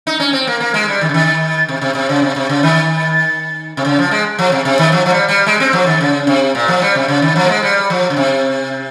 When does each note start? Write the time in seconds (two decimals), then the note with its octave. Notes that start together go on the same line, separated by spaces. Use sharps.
0.07 D#4
0.20 C#4
0.33 C4
0.47 A#3
0.60 A#3
0.74 G#3
0.88 G3
1.01 D#3
1.09 C#3
1.14 D#3
1.68 C3
1.81 C3
1.95 C3
2.09 C#3
2.22 C3
2.36 C3
2.49 C#3
2.63 D#3
3.77 C3
3.85 C#3
3.99 F3
4.11 G#3
4.39 F3
4.52 C3
4.65 C3
4.79 D#3
4.92 F3
5.06 F3
5.10 G3
5.29 G3
5.46 G#3
5.60 C4
5.73 F3
5.86 D#3
6.01 C#3
6.27 C3
6.55 A#2
6.68 F3
6.82 G3
6.95 C3
7.08 C#3
7.22 D#3
7.36 F3
7.44 A#3
7.49 G#3
7.63 G3
7.90 F3
8.10 C#3
8.16 C3